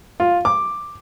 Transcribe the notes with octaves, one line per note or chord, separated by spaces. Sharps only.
F4
D6